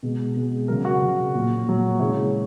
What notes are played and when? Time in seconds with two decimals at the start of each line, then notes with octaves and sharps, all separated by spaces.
0.03 B2 G#3
0.36 B2 G#3
0.68 C#3 F#3 A#4
0.85 F#4
1.02 C#3 F#3
1.35 A#2 F#3
1.67 A#2 F#3
2.00 C#3 E3 G#3 C#5